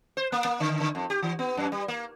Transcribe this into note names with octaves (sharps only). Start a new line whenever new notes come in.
C5
A#3
A#3
D3
D3
F2
G4
E3
B3
F#2
G3
A#3